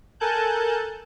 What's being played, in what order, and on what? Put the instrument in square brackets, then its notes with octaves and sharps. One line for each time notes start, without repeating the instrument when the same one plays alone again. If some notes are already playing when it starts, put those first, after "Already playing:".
[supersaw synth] A4 A#4 G#5 A5 F#6 G6